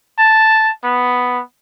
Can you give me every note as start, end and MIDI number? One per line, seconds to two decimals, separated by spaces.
0.19 0.70 81
0.84 1.40 59